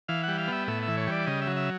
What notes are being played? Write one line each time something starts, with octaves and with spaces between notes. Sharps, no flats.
E3 F5
G3 F#5
F5
B3 E5
A2 E5
E5
E3
C#5
G3 D5
C#3 D#5
E5
F#3
E5